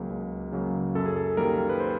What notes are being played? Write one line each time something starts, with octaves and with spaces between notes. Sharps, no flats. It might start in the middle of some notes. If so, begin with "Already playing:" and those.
Already playing: C#2 C#3 F#3 A#3
C#2
C#3 F#3 A#3
F#2 A4
G#4
A4
D#3 G3 A#3 A#4
B4
C5